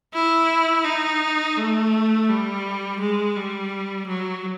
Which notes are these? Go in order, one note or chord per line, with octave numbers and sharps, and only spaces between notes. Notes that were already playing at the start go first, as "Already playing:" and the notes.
E4
D#4
A3
G3
G#3
G3
F#3